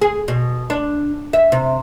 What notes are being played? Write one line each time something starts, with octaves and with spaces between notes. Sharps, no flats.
G#4
B2
D4
E5
C3